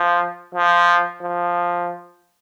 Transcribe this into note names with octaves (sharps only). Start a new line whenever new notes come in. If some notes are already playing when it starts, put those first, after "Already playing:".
Already playing: F3
F3
F3